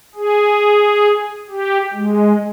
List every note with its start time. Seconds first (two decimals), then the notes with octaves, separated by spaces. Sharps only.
0.15 G#4
1.50 G4
1.93 G#3